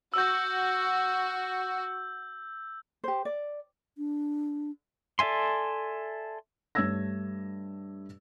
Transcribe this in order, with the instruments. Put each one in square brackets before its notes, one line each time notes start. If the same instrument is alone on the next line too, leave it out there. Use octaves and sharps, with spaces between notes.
[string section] F#4 [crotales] E6 G6
[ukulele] G4 C5
D5
[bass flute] D4
[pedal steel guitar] A4 D5 E5 G#5 C6
[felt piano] G2 A3 C#5 E6 G#6 A#6